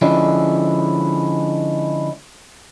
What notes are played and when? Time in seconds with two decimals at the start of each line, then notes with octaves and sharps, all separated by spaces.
0.02 D3 F3 G#3 C#4 D4 E4